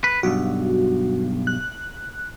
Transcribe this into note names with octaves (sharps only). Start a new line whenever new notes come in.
B4
B1 G2 F#4
F#6